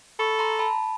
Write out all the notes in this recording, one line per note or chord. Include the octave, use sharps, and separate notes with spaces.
A4 B5 C#6
A#5 C6
A5 B5